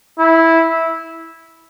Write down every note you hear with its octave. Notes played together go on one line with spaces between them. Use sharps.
E4